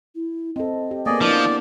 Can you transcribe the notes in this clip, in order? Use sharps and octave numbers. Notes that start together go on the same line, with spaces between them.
E4
C4 A4 D#5
G4
A#3 B3 G#4 D5 D#5
F3 D4 E4 D5 D#5